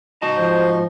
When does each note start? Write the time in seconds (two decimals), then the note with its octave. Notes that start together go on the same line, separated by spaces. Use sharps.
0.22 G#2 D#4 F#4 A5
0.37 F3 C5